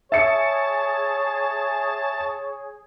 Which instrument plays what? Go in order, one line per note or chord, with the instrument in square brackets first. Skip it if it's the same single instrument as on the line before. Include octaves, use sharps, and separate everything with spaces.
[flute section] G#4 [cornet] C#5 [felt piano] E5 C#7 [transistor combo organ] A5